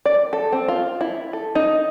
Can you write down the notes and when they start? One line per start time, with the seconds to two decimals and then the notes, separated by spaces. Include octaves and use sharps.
0.06 D5
0.33 A4
0.52 C4
0.68 F4
1.01 E4
1.33 A4
1.55 D#4